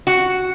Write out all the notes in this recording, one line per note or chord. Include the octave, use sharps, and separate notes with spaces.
F#4